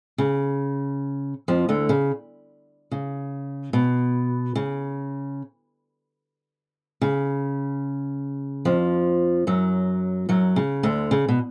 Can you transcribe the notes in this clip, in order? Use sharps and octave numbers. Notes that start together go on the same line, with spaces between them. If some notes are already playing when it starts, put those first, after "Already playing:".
C#3
F2 F3
D2 D3
C#3
C#3
B2
C#3
C#3
F2 F3
F#2 F#3
F#2 F#3
C#3
D2 D3
C#3
B2